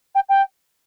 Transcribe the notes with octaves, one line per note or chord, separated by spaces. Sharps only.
G5
G5